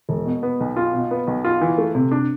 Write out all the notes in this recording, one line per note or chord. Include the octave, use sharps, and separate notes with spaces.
E1
B2
B3
B1
F4
B2
B3
B1
F4
E3
A3
C3
D4